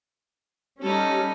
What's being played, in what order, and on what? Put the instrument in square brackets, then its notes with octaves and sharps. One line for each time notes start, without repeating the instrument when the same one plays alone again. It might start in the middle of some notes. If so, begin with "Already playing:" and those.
[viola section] G3 C#4 [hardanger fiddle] D#4 A4